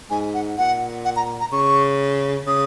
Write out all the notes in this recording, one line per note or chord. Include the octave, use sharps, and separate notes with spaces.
G#2 G#5
F#5
A#2 F#5
F#5
A#5
A#5
C#3 C#6
C#3 D#6